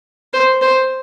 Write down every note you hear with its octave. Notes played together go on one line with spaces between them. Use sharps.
C5
C5